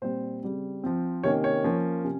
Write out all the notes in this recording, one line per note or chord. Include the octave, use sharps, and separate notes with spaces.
A#2 G3 C4 C5
C#3 G3 C4
F3 C4
C3 D#3 A#3 C#4 C#5
C#5
F3 A#3 C#4
C3 C#4